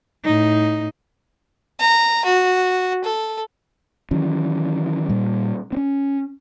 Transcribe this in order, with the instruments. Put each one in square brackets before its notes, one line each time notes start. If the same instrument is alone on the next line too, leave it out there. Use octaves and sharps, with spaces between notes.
[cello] A2 D#4
[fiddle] A#5
F#4
A4
[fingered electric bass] D#3 E3 F#3 C#4
A#2 G3
C4 C#4